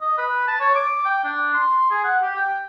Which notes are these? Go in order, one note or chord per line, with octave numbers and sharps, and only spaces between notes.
D#5
B4
A5
C#5
D6
G5
D4
C6
G#4
F#5
G4
G5